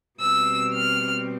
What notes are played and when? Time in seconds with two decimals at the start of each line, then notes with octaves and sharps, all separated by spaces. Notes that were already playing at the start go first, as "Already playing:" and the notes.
0.19 B2 G3 C4 E6
0.73 F6